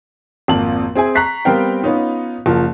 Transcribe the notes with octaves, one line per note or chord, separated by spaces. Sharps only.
G#1 F2 A#3 A5 F#7
C4 G#4 E5 G#5
A#5 C#6 F#6 B6 C7
G3 B3 C4 A#4 F5 G5
B3 C#4 D#4 F4
F#1 F3 A#4